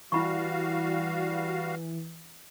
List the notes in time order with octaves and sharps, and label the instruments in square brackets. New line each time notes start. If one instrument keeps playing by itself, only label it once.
[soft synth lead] E3 [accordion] G3 F#4 F5 [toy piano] E4 B5 C#6